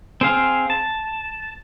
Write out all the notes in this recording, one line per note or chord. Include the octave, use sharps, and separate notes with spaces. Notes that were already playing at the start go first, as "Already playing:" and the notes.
C4 G#4 F5
A5